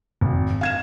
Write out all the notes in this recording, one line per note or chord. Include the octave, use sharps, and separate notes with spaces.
G#1
F5 G#6 E7